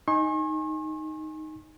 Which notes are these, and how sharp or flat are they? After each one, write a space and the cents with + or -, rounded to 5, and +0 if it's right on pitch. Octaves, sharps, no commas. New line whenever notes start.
D#4 +0 G#5 +0 C#6 -45